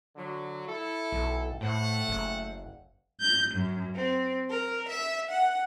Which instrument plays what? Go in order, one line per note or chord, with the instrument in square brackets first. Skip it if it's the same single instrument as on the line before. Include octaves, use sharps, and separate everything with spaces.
[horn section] D3 F#3
E4 A4
[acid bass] B1
[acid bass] A2 [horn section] A3 C5 F#5
[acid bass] F#1
[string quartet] G6
F#2
C4
A#4
E5
F#5